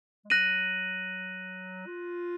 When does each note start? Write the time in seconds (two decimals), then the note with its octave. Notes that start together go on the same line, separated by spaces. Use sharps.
0.25 G#3
0.30 F#3 F#6 A#6 D#7 F#7
1.87 F4